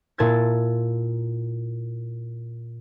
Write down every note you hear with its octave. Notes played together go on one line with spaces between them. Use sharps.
A#2 E4 A5 G#6 A6